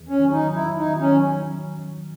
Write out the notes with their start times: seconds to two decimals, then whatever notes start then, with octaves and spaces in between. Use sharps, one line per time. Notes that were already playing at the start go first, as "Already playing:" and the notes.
Already playing: E2
0.09 C#4
0.19 D#3 F#3
0.31 D#4
0.54 E2 E4
0.77 D#4
0.89 D#3 F#3
1.00 C#4